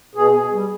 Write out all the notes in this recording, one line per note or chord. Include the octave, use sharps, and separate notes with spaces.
B2 G#4
G#4
G3